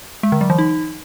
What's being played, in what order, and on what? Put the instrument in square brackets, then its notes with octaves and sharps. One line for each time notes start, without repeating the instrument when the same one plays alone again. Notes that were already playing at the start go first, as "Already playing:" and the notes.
[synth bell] G#3
D3
F#3
E3
D#4